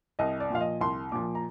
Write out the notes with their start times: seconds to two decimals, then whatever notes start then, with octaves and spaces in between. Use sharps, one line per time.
0.19 C2 D#5
0.40 D5
0.50 A#2 F3 F5
0.61 D#5
0.81 C2 C6
1.12 A#2 F3 D6
1.35 A#5